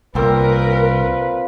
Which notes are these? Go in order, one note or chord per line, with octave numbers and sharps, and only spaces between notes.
C2 A#2 A#3 C4 A#4 B4